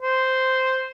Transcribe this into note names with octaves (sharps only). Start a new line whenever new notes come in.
C5